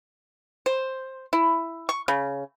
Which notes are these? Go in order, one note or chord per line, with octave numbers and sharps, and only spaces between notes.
C5
E4
C#6
C#3